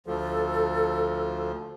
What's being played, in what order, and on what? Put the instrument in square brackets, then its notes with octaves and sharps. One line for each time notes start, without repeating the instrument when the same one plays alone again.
[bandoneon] D2 F3 [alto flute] A4